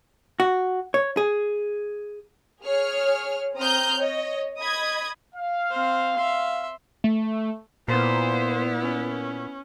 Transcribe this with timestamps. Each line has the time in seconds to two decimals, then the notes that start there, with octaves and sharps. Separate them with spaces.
0.40 F#4
0.94 C#5
1.17 G#4
2.62 G#4 C#5 F6
3.57 C4 A#5 D#6 F6 G6
3.97 C#5 D#5
4.59 D#5 B5 D#6 G#6
5.35 F5
5.71 C4 C5
6.16 E5 C6
7.04 A3
7.88 A#2 B3 E4 C5
8.82 C#4